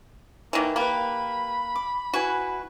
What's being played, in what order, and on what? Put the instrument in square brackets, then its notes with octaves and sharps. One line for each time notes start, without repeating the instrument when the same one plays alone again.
[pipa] D#3 E3 [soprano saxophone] A#3
[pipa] A#3 [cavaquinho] G4 B4 [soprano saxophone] B5
[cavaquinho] D6
[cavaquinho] E4 B4 G#5 [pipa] F#4